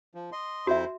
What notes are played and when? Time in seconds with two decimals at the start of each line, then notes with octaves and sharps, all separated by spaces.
0.15 F3
0.32 D#5 C6
0.67 F2 E4 F#4 C5 E5